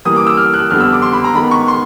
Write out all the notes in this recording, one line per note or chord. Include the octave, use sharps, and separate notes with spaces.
E3 G3 A#3 D#6
D6
E6
F6
F#6
F2 D3 G3 B3 F6
E6
D6
C6
B5
A#5
D#3 G#3 B3 B5
C#6
C6